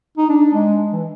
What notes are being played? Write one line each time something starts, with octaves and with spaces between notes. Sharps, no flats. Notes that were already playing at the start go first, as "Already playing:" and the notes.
D#4
D4
G#3
E3